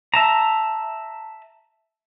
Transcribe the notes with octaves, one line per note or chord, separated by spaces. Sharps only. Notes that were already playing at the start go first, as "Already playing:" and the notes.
E5 A5 A#5